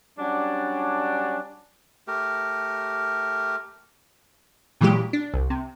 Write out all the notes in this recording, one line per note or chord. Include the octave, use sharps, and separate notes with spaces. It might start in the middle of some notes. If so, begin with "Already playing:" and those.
F#3 G3 C#4 D4
A3 G4 A#4
A#2 E3 F#3 G#3 G4
D4
C2
C3